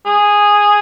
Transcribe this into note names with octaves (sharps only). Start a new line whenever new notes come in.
G#4